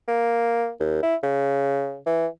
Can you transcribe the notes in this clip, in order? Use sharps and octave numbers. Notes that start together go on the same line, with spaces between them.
A#3
D#2
E4
C#3
E3